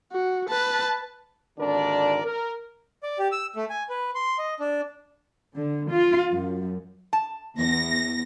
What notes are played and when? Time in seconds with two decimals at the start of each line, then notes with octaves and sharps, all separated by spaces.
0.12 F#4
0.49 B4 A5
1.58 G#1 D#2 D3 D4 A#4 D5
2.24 A#4
3.03 D5
3.19 G4
3.32 E6
3.56 A3
3.70 G#5
3.89 B4
4.15 C6
4.38 D#5
4.60 D4
5.56 D3
5.91 F4
6.32 F#2
7.13 A5
7.57 E2 A#6